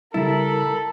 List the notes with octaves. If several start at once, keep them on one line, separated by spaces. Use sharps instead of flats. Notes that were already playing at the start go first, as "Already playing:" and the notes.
C#3 G3 E4 A4 A#4 B5 A6